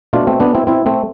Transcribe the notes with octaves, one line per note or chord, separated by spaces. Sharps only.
B2 A3 D4 F4
A3 C4
B3 D4
C4 E4
C4 E4
A3 C4